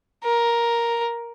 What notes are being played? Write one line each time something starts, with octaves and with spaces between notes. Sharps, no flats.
A#4